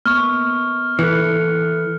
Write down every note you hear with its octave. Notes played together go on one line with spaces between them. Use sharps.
A#3 B3 C#6 F6
E3 A4 F#6 C#7